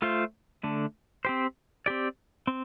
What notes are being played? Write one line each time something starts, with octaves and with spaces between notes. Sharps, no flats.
A3 F4 C5
D3 A3 D4
C4 G4 C5
C4 G4 D5
C4